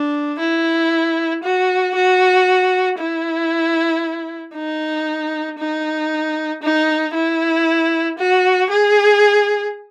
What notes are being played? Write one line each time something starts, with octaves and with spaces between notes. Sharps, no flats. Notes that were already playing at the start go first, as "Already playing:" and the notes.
Already playing: D4
E4
F#4
F#4
E4
D#4
D#4
D#4
E4
F#4
G#4